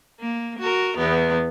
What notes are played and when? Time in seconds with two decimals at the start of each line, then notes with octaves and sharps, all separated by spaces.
0.20 A#3
0.59 F#4 A#4
0.97 E2 B3